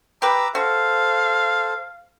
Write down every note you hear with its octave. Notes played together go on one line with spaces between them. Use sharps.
G4 B4 A#5 D6 E6
F#4 A4 C5 F5